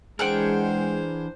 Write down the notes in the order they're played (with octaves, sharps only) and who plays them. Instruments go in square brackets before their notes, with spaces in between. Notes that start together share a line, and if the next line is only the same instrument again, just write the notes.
[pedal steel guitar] E3 D4 A#4 [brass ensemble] G#3 [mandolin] G#4 F#5 G5 [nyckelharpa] C5